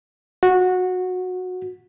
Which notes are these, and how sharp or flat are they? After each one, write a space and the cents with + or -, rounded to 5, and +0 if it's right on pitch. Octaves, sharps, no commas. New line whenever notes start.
F#4 -15